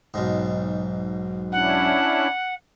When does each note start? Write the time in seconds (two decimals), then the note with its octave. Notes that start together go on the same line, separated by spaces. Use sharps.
0.14 B1 G#2
1.52 C#4 D4 E4 F#5